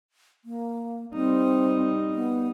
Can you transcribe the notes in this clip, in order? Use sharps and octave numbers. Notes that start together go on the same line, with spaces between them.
A#3
G3 C4 D#4
B3